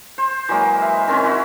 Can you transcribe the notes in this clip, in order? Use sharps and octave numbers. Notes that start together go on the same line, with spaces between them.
C5
E3 F#3 G#3 A#3
E5
D#3 C4 C#4
E4 F#4